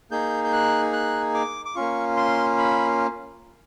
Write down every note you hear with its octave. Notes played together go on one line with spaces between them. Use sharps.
A#3 D#4 G#4 G6
G6
F#6
F#6
D6
D6
A#3 C#4 F4 C#6
C6
B5